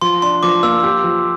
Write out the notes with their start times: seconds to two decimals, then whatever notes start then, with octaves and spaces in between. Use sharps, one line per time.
0.02 F3 C6
0.22 D4 C6
0.43 F3 D6
0.63 A#3 E6
0.83 G4
1.04 F3